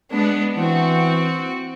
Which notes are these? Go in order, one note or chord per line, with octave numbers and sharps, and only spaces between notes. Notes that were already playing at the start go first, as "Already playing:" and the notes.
G#3 B3 D4
E3 C4 F#4